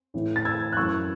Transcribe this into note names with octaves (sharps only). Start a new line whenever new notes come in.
A2 E3
A6
E6 G#6
F#6
F#2 E3 C#6 E6